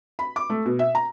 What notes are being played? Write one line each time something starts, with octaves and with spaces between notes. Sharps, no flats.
B5
D6
A3
B2
E5
A#5